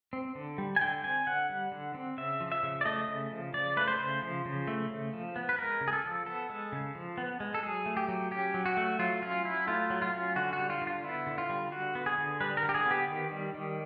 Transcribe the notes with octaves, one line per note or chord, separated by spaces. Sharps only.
C4
D3
G3
G#5
D3 G5
C4 G#5
D3 F#5
G3
D3
C4
C#3 E5
F3
E5
C#3
D5
A3 D#5
C#3
F3
C#3 D5
A3 B4
C5
C#3
F3
C#3
A3
C#3
F3
B3
B4
G#3 A#4
C#3
G#4
A4
F3
B3 A4
G#3
C#3
F3
B3
G#3
A4
F#3 G#4
A3
G4
F#3
C#4 G4
F#3
F#4
A3
F#3 F4
C#4 F4
F#3 E4
A3 F4
F#3
F4
C#4
D3 F#4
F#4
G3
F4
D3
F4
B3 E4
D3
F4
G3
D3 F#4
B3
G#4
D3
G3 B4
A#4
D3
G4
G#4
B3
G4
D#3
G3
D#3